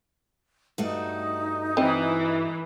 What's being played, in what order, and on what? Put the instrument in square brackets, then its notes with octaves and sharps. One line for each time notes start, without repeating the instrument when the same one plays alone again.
[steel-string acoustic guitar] G2 A3 F#4 [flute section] D#4
[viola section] E3 [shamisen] C4 D#5